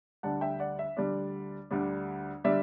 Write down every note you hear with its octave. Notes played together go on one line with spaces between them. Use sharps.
D2 D3 G3 D4 F#5 A5
E5 G5
D5 F#5
E5
D2 D3 G3 D4 D5
D2 D3 G3 D4
D3 G3 D4 E5